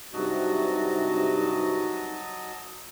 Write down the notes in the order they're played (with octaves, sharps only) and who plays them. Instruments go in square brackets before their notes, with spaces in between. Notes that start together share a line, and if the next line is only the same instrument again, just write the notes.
[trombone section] G2 C3 [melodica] F#3 D#5 A5 [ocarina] D#4 [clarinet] F#4